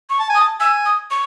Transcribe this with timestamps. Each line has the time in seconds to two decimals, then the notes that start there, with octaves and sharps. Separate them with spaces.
0.10 C#6
0.19 A5
0.30 G#5
0.35 D#6
0.40 A5
0.60 G#5 E6
0.86 D#6
1.11 C#6